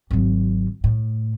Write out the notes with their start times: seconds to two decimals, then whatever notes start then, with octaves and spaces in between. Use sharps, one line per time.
0.11 G#1 F#3
0.84 A2